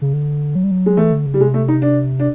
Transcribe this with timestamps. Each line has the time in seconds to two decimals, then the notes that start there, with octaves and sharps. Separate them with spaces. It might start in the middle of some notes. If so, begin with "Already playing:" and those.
0.02 C#3
0.13 D3
0.55 F#3
0.64 G3
0.71 F#3
0.86 G#3
0.97 E3 A3
1.12 D3
1.26 C#3
1.34 G3
1.40 C3 G#3
1.54 A3
1.68 D#4
1.82 D4
2.20 D4